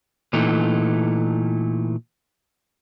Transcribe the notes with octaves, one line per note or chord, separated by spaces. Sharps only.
A#2 E3 A3 D#4